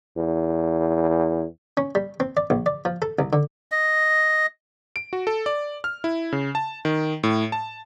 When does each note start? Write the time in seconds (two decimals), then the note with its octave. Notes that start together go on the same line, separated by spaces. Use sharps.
0.17 E2
1.77 C#4
1.95 G3
2.20 C4
2.37 D5
2.50 A#1
2.66 D5
2.85 F3
3.02 A4
3.19 C2
3.33 D3
3.72 D#5
4.96 D7
5.13 F#4
5.27 A4
5.46 D5
5.84 F6
6.04 E4
6.32 C#3
6.55 A5
6.85 D#3
7.23 A2
7.52 A5